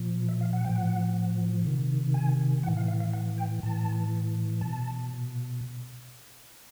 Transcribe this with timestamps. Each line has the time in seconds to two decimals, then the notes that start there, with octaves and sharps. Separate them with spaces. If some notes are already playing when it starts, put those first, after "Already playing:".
Already playing: A#2 F3
0.29 E5
0.41 F5
0.53 F#5
0.64 A2 F3 G5
0.76 F#5
1.65 C3 D#3
2.14 G#5
2.63 E3 F#5
2.68 A2
2.77 F5
2.88 F5
3.00 F5
3.13 F#5
3.38 G5
3.63 A2 E3 A5
4.61 B2 A5